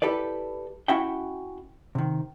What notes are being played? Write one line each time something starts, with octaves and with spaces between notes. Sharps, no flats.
E4 G4 A4 B4 D5
C#4 E4 F#4 E5 F#5 G5
C3 D#3